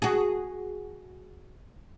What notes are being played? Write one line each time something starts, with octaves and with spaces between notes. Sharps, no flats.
F#4 G#4